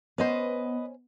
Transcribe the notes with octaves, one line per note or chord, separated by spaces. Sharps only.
B3 C#4 B4 C5 D#5